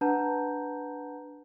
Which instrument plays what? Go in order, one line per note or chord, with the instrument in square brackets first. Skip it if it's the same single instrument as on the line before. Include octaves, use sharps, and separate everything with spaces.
[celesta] D4 B4 F#5 A5 A#5 G6